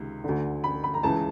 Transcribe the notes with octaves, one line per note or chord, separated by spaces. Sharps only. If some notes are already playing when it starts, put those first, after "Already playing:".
Already playing: C#2 C3 D#3
D2 D3
B5
B5
A#5
C#2 C#3 E3 A5